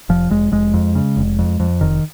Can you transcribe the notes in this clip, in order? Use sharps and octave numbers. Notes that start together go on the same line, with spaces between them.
F1 F3
F1 G#3
F1 G#3
F2
C#3
F1
F2
F2
F1 D#3